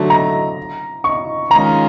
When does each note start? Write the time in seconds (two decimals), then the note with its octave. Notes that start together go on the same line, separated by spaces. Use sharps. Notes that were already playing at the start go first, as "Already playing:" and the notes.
Already playing: D3 F#3 A3
0.10 A#5
1.04 C#6
1.51 D#3 G#3 C#4 F4 G#4 A#5